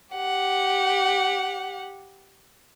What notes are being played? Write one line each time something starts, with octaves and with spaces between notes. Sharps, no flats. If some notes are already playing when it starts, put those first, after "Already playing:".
G4 F#5